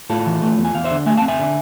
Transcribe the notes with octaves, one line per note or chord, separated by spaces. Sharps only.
A2 F4 A4
E3
A3
E2
G#5
E2 F5
C5 E5
D3
A3 E5 G#5
C4 F5 A5
E5 G#5
D3